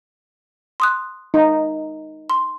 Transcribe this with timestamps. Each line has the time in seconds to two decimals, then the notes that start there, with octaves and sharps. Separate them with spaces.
0.80 C6 D#6 F#6
1.34 D#4
2.30 C6